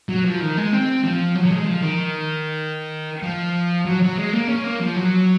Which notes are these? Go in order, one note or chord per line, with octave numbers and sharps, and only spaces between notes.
F#3
F3
D#3
G#3
C4
F3
F#3
F#3
G#3
F3
D#3
F3
F#3
F#3
G#3
A#3
C#4
A#3
F3
F#3